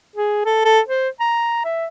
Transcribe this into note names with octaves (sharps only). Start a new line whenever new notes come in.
G#4
A4
A4
C5
A#5
E5